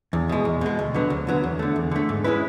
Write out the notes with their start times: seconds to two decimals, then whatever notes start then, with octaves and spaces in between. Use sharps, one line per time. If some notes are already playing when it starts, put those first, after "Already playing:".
0.13 E2
0.29 B2 G#3
0.45 E2
0.61 B2 G#3
0.79 D2
0.94 D3 F#3 B3
1.10 D2
1.27 D3 F#3 B3
1.44 E2
1.59 D3 A3
1.76 E2
1.91 D3 A3
2.09 G#2
2.24 G#3 C#4 E4 B4